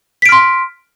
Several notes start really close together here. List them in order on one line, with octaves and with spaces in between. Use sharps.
B6 D7 F6 C6